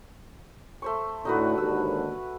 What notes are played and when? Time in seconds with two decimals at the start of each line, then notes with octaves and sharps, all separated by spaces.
0.82 A3 C5 C#6
1.25 A2 D3 D#4 F#4 B4
1.58 D#2 G#2 D3 E6